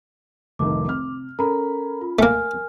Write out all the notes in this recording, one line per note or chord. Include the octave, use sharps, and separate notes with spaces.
F1 C2 D#3 D6
C3 F6
C#4 A4 A#4 A#5 B5
F4
A3 A#3 A#4 G#5 F6